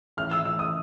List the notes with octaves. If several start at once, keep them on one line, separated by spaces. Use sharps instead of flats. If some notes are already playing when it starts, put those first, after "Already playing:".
A1 F6
A1 E6
E6
A1 D#6